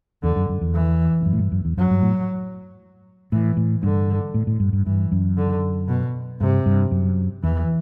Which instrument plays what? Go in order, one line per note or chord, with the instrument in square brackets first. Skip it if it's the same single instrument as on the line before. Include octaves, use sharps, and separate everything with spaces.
[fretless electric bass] E2 [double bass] D3
[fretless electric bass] F#2
F#2
E2
[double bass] E3
[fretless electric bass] E2
F#2
A2
G2
F#2
E2
[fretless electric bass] F#2 [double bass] F#3
[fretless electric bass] G2
A2
[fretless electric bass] A2 [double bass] E3
[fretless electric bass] A2
[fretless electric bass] G2 [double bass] D3
[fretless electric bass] A2
A2
G2
G2
[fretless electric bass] G2 [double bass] E3
[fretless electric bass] F#2
[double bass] D3
B2
[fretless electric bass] G2 [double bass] C3
[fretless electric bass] G2
F#2
[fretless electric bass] E2 [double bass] E3